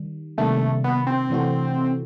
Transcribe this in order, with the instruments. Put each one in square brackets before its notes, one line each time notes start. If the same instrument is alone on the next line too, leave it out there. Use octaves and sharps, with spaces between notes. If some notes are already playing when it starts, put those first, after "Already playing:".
Already playing: [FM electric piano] D#3 G3
[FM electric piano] C3 D#3 G3 A#3 D4 [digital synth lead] A3
[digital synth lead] B3
C4
[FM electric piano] C3 E3 A3 D4 F#4